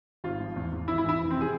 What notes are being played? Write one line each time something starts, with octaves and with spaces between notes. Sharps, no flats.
G#1 F4
F3
E2
E2
G#1 E4
E4
E3
E4
F1
C4
C3
G#4